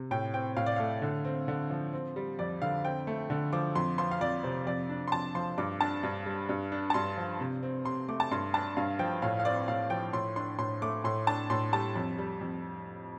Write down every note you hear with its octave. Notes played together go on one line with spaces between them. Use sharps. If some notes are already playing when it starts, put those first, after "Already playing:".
Already playing: C3
A2 G5
C4 G5
A2 F5
D5
A3 F5
D3
C4
D3
F3
C4
G3
F2 D5
D3 F5
C4 G5
A3
D3
F3 D6
F2 C6
F3 C6
F5
F2 D5
C3 C5
F2 D5
D4
C6
F2 A5
F3 C6
G2 D6
D4 A5
G2
G3
G2
D4
A5
G2 C6
F3
C3
C4
C3 C6
A3 D6
A5
G2 C6
D4 A5
G2 F5
F3 G5
A2 F5
F5
C4 D5
A2 F5
F3 G5
A2 C6
D4 C6
A2 C6
A3 D6
A2 C6
D4 A5
A2 C6
G3 A5
F2
G3
F2